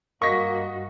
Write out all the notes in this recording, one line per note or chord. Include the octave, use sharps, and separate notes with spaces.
G2 A#3 F#4 D#5 C#6 A#6 B6